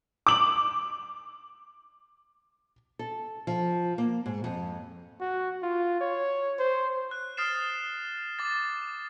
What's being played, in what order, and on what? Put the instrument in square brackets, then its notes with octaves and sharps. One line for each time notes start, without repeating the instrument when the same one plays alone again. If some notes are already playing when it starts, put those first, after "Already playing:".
[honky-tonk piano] D6 F#7
[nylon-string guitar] A4
F3
A#3
G#2
F2
[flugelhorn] F#4
F4
C#5
C5
[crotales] F#6
D#6 F6 A6 C7 E7
D6 A6